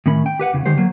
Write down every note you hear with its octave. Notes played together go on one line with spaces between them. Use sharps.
A2 D#3 C#4 B5
G5
G4 B4 F#5
E2 C#3 E3
D3 D#3 G#3 G4 C5
F#3 A#3